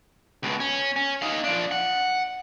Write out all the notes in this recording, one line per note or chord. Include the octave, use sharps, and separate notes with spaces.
C#2 B2
C#4
C#4
D#4 F5
F3 D4
F#5